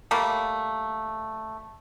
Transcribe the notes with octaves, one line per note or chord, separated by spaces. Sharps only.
G3 A3 A#3